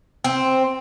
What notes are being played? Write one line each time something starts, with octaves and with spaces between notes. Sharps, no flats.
C4